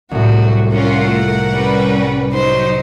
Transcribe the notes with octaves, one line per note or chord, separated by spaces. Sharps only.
C2 A2 F#3 A3 F#4
C#4 F4 A#4 F#5
A3
G3 C#4 B4
F#3 D#4 C5 C6